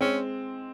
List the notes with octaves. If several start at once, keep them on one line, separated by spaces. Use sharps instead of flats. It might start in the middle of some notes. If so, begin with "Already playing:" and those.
G#3 C4 C#4